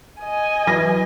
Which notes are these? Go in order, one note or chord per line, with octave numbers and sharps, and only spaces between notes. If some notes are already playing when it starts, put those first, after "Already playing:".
D#5 G#5
E3 F#3 A#6